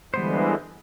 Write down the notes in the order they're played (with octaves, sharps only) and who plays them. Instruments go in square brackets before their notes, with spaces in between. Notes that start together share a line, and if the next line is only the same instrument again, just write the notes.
[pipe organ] D3 E3 G#3 [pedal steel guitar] G3 B3 C5